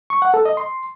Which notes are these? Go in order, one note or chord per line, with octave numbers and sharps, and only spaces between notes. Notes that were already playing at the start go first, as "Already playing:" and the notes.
C#6
F#5
A4
D#5
C6